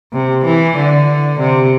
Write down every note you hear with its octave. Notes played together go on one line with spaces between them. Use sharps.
C3
E3
D3
C3